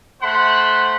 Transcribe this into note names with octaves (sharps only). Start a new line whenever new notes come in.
A3 C5 F#5 B5